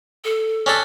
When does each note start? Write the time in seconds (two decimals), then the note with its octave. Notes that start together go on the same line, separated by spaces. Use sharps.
0.24 A4
0.66 C#4 D4 A4